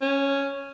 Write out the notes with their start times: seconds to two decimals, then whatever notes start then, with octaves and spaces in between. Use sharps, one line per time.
0.01 C#4